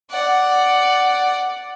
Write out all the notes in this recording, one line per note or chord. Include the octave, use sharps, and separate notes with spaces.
D5 F#5